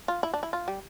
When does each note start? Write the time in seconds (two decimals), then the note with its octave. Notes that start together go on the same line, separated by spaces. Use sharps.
0.08 F4
0.23 E4
0.34 D4
0.43 E4
0.53 F4
0.68 G3